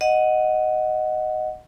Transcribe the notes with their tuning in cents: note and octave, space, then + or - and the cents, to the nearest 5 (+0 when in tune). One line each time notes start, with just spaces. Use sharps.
D#5 +0 F#5 +0